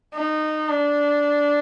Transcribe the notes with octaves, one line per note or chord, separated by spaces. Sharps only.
D#4
D4